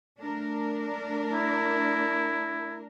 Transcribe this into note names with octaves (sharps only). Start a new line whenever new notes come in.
A3 D4 A#4
E4